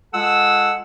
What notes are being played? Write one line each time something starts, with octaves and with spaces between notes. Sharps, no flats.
G#3 F4 A4 F#5 E6